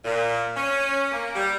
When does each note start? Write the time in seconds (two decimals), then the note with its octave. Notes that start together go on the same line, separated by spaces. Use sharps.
0.04 A#2
0.56 C#4
1.12 A#3
1.35 G3